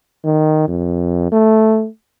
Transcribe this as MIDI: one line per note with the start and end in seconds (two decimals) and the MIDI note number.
0.24 0.67 51
0.68 1.30 41
1.32 1.87 57